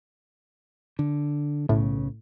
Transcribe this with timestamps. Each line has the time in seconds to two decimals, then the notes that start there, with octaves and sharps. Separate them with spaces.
0.99 D3
1.69 B1 A2 C#3